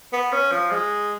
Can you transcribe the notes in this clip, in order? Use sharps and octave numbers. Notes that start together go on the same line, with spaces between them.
B3
C#4
F3
G#3